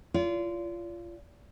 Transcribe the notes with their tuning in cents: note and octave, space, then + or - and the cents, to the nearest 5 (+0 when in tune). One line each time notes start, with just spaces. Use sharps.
F4 -25 D5 -40